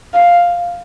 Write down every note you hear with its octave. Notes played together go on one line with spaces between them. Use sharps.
F5